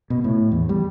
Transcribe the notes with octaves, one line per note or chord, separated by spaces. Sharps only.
B2
A2
E2
G3